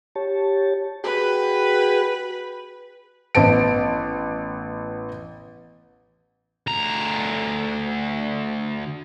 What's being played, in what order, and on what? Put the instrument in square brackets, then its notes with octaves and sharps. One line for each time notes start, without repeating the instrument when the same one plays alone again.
[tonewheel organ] G4 C#5 A5
[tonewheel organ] F#4 G#4 G5 [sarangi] B4
[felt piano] A1 B3 A5 D7
[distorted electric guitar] D2 A#5